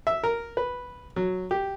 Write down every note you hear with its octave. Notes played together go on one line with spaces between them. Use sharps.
E5
A#4
B4
F#3
G4